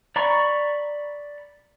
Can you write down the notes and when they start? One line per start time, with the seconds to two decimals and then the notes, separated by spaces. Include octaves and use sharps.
0.16 D5 A#5 B5 C#6